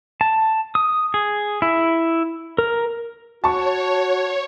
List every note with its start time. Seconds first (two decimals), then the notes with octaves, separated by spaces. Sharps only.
0.21 A5
0.75 D#6
1.14 G#4
1.62 E4
2.58 A#4
3.44 F#4 C#5 A5 C#6